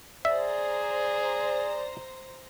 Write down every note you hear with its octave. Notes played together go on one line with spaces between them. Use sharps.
G#4 C5 D5 E5 A#5